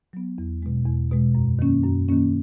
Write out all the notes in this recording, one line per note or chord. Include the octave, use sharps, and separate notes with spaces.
F#3 B3
E2
B2 G#3
E2
B2 G#3
F#2
D#3 A#3 C#4
F#2
D#3 A#3 C#4